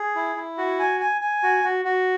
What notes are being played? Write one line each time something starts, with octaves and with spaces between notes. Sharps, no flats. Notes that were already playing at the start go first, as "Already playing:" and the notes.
Already playing: G#4
E4
E4
F#4
G#5
G#5
G#5
F#4
F#4
F#4